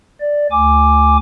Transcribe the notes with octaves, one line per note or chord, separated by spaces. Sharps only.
D5
D2 G#5 D6